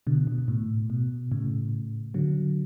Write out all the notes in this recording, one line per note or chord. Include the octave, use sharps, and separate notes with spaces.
B2 D3
B2
B2
B2
A2
B2
A2 C#3
D3 F#3